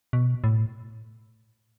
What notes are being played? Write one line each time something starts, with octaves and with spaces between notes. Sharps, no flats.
B2
A2